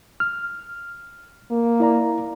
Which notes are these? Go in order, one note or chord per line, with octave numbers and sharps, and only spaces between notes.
F6
A#3
E4 D5 A#5